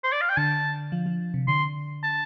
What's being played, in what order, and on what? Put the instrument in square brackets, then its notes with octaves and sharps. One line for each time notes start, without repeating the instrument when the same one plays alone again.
[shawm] C5
D5
F5
G5
[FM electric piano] D3 [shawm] A5
[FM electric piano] F3
F3
C3
[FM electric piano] D3 [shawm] C6
[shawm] A5